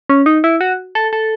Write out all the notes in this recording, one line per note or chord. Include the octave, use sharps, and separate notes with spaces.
C#4
D#4
E4
F#4
A4
A4